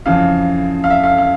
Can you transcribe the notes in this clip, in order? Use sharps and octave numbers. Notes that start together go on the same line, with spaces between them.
F2 C#3 E3 F5
F5
E5
F5
F5